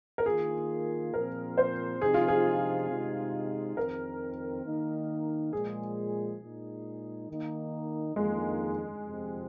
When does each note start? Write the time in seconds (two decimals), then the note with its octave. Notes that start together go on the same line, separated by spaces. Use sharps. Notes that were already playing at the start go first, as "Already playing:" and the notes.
0.18 A#4
0.26 D#3 A#3 F4 G#4
1.14 A#2 F3 C4 A#4
1.58 C5
2.01 C3 F3 C4 D#4 G#4
2.14 F4
2.28 G#4
2.90 C3 G#3 D#4
3.77 F2 D#3 C4 A#4
4.65 D#3 A#3 D#4
5.53 A#2 F3 G#3 G#4
6.40 A#2 G#3 D#4
7.28 D#3 A#3 D#4
8.16 F2 D#3 G#3 A#3 D#4
9.03 F2 C3 F3 C4